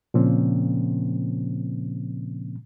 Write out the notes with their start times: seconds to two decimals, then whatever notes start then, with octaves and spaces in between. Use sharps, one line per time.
0.14 A#2 C#3 F3 A#3 C4 C#4